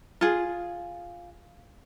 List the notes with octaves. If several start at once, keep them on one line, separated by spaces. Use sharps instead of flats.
F4 G#4